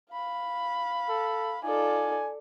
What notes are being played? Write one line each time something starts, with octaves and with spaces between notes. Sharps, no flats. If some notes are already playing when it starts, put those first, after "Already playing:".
F5 B5
A4
D#4 F4 A4 D5 G#5